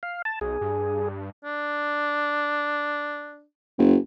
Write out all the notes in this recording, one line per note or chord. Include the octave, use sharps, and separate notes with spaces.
F5
A5
B1 G#4
G2
D4
F#1